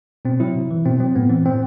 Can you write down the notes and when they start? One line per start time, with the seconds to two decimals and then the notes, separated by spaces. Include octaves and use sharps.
0.25 B2 C4
0.40 F#3 E4
0.56 C3
0.71 E3
0.85 B2 C4
1.00 F#3 C4
1.16 A2 B3
1.30 E3 C4
1.45 A2 C4